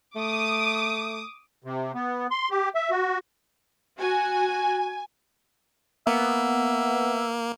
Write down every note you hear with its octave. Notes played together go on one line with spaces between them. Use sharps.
A3 D6 D#6
C3
B3
C6
G4
E5
F#4
F#4 G#5
A#3 B3 E5